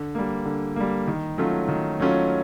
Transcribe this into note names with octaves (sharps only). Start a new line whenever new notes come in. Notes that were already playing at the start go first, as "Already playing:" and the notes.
Already playing: D3
G3 A#3
D3
G3 A#3
D#3
F#3 A3 C#4 F4
D#3
F#3 A3 C#4 F4